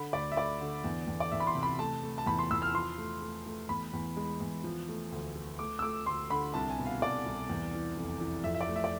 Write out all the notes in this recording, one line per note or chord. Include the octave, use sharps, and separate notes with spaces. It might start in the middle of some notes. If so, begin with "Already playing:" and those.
Already playing: D3 B5
D2 D5
E5
D2 D5
D3
E2
E2
D5
E2 E5
B5
C6
C3
B5
A3 A5
A3
A5
E2 B5
C6
E2 E6
F6
F3 C6
A3
A3
A3
E2 B5
E2
G#3
E2
F3
A3
D2
A3
A3 D6
E6
A3 D6
D2 C6
D3 B5
C2 A5
G#5
B2
F5
C2 D5
C2
E2
E3
F1
E3
F2 E5
E5
D5
A3
E5
D5